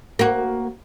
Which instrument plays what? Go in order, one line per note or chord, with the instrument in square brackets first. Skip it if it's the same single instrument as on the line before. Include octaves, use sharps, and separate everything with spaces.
[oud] A#3 F#4